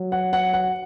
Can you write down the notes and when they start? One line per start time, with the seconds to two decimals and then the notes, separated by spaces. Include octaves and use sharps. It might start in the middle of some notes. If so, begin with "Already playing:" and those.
Already playing: F#3
0.12 F#5
0.33 F#5
0.53 F#5